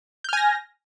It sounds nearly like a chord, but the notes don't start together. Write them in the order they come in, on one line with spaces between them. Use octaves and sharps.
G6 F6 G#5 A#6